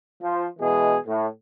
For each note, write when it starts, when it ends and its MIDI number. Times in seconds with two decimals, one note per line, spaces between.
0.23 0.45 53
0.23 0.45 72
0.59 0.96 47
0.59 0.96 52
0.59 0.96 56
0.59 0.96 68
1.06 1.27 45